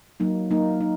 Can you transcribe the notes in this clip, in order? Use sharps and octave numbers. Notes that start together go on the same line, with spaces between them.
F#3 A#3 D#4
F#3 A#3 D#4
D#4